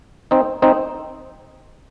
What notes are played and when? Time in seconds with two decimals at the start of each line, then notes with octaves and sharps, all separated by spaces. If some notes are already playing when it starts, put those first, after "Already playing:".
0.31 C4 D#4
0.62 C4 D#4